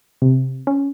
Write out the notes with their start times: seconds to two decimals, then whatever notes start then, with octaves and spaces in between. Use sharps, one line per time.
0.22 C3
0.67 C#4